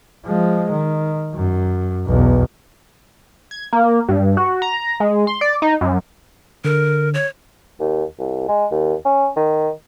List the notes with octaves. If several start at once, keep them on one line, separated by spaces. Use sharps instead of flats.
F3 G#3
D#3
F#2
B1 E2
G#6
A#3
G2
F#4
A#5
G#3
C6
D5
D#4
F#2
D3 A#4
C#5
D#2
C2
G#3
D#2
C#4
D#3